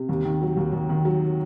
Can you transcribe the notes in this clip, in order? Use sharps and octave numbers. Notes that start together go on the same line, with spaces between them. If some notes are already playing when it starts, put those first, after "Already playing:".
Already playing: C3
D#2
D#3
F#3
D#2
D#2
D#3
F#3